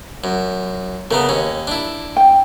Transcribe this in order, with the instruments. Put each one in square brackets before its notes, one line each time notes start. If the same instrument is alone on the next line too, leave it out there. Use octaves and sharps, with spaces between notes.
[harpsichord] F#2
[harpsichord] C#3 A3 B3 [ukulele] A#4
[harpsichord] D#2 C#4
D4 E4
[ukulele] G5